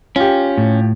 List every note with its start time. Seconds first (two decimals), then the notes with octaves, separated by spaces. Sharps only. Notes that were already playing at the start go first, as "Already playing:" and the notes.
0.16 C#4 F4 G4
0.58 A2